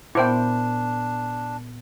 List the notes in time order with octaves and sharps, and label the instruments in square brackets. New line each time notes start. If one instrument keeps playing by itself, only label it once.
[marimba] A#2 B3 [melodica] D4 [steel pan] E4 C5 G5